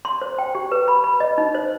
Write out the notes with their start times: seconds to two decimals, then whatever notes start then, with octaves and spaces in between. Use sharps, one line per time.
0.05 C6
0.22 C5
0.39 G5
0.55 G4
0.72 B4
0.88 B5
1.04 B5
1.20 D#5
1.38 D#4
1.55 C5